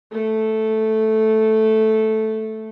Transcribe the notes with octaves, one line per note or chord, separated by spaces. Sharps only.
A3 A4